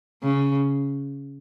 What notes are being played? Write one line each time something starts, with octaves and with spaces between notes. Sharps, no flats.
C#3